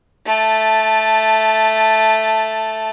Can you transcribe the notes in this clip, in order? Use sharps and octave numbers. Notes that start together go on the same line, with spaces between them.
A3 A5